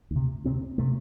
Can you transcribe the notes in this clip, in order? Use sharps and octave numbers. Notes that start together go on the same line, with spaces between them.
D2 C3
D2 C3 C4
C3 A3